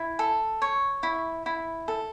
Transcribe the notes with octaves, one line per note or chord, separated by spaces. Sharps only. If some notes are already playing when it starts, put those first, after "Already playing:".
Already playing: E4
A4
C#5
E4
E4
A4